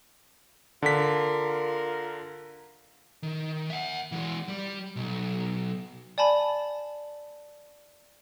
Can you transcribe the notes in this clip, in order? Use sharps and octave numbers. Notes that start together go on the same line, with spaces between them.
D3 F4 A#4 B6
D#3
E5 F#5
E3 G#3
G3
B1
D5 G#5 A5 B5